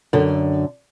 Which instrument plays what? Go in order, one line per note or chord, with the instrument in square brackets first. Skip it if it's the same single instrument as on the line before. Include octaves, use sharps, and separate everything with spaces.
[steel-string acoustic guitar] F#2 D3